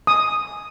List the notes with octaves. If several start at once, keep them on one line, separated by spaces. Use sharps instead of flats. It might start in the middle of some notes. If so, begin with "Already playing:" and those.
D#6